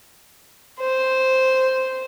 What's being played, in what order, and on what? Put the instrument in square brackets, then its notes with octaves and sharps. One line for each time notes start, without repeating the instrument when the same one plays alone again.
[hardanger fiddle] C5